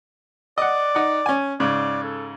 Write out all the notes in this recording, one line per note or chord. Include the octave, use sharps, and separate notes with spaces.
D5 D#5 F#5
D#4 F#5
C#4 G#5
G#2 C#3 D5
A4